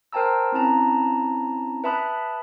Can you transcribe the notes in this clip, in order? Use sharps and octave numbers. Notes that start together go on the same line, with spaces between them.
A#4 C5 G5 A5 A#5 E6
C4 C#4 E4 A5 A#5
B4 E5 A5 B5 D#6 F#6